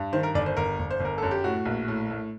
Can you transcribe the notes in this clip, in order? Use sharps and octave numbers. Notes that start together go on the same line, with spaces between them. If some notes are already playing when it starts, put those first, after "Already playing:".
Already playing: G2
D#3 C5
A#4
G1 D5
C5
G1 A#4
G1
C5
G1
A#4
F#2 A4
G4
A2 F#4
A#1
A2
A2